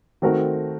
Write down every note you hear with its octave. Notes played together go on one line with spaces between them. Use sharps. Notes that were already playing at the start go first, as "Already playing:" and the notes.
D#3 A3 C4 F#4 A#4